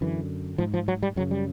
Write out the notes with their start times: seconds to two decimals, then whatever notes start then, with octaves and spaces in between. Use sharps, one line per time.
0.01 F#2 D3 E3
0.58 G#2 F3
0.74 F3
0.88 F#3
1.03 G3
1.16 F#2 C#3 F#3
1.31 G3